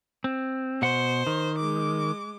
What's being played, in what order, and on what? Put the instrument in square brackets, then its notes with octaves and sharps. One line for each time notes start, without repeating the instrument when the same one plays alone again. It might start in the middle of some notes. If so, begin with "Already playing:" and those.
[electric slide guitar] C4
[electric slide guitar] B2 F#5 [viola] C5
[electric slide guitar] D#3
[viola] G#3 D6